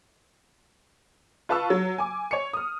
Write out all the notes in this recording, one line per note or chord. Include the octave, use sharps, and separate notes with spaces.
F4 B4 A5 C#6 E6
F#3
G#5 D6
C#5 C#7
D#6 F6